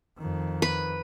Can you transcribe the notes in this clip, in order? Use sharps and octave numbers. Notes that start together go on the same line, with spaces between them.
F2 D#3
B4